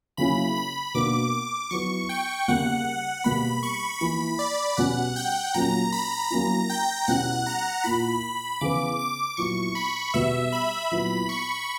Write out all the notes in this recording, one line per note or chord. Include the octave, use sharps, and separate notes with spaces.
C#3 F#3 A#3 C#4 E4 B5
B5
B2 A#3 D4 F#4 D6
D6
F#3 B3 E4 C#6
G5
C#3 G3 A#3 F#5
B2 G3 A#3 B5
C#6
E3 A#3 E4 B5
D5
B2 G3 C#4 F#4 F#5
G5
A#2 F#3 A#3 C#4 A#5
B5
F#3 A#3 C#4 E4 A#5
G5
B2 G3 C#4 E4 F#5
A#5
A#2 A#3 E4 B5
C#3 E3 B3 D6
D6
A#2 F#3 B3 E4 C#6
B5
B2 G3 B3 F#4 E5
B5
A#2 F#3 B3 E4
C#6